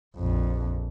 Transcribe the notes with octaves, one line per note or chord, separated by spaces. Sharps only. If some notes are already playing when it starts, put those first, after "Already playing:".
A#1 F2